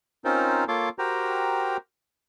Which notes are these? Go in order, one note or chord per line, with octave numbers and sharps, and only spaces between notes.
C4 C#4 D#4 F4 A#4 C5
A#3 F4 A4 C#5 C6 D6
F#4 G4 A#4 C5 G5 A#5